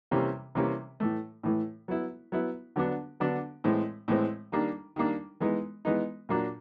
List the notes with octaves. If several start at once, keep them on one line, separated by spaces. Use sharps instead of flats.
C3 E3 G3 A#3 C#4
C3 E3 G3 A#3 C#4
A2 E3 A3
A2 E3 A3
F#3 B3 E4
F#3 B3 E4
D3 F#3 B3 D4
D3 F#3 B3 D4
A2 E3 G#3 C4
A2 E3 G#3 C4
D#3 G3 A#3 D4
D#3 G3 A#3 D4
E3 G#3 B3 D#4
E3 G#3 B3 D#4
A#2 F#3 A#3 D4